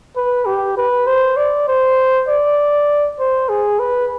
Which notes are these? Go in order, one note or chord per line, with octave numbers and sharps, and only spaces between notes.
B4
G4
B4
C5
D5
C5
D5
C5
G#4
B4